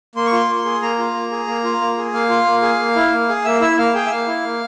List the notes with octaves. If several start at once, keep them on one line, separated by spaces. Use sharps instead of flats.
A#3 C6
C#6
F4 C6
A#3
G#4
A#3 A#5
F4
A#3
G#4
A#3
F4
A#3
G#4
A#3 F5
F4
A#3
G#4
A#3
E4
A#3
G#4
A#3 E5
E4 E5
A#3 F5
G#4 G5
E5
A#3 F5
E4
A#3